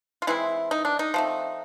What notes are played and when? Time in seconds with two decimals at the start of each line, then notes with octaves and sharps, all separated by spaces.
0.22 F4
0.27 E3 G#3 C4 E4
0.71 D#4
0.85 D4
0.99 D#4
1.14 F3 A3 C4